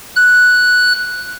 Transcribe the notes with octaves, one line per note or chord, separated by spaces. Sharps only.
F#6